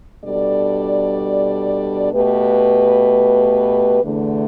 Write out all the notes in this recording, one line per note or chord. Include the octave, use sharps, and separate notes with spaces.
B2 G3 D4 A4 D5
B2 A3 G4 B4
E2 D3 A3